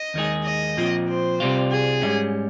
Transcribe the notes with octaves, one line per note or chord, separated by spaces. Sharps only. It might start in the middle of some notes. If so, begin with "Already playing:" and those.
Already playing: D#5
D#2 D#3 G#3 D#4 G#4
D#5
A#2 F3 C4
C5
C2 C3 G3 C4 F4
G#4
G#2 G3 C#4